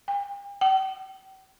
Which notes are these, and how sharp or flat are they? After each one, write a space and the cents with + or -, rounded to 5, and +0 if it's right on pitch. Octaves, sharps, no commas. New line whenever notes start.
G5 +45
G5 -40